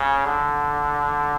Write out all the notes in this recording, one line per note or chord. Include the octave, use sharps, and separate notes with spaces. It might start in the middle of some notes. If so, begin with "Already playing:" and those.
Already playing: C#3
D3